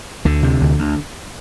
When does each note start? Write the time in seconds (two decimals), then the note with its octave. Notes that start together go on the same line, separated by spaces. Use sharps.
0.25 D2 D3
0.43 C3
0.62 D2
0.79 D2